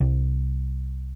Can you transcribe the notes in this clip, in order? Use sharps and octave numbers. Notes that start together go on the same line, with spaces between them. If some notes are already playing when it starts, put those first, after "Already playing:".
C2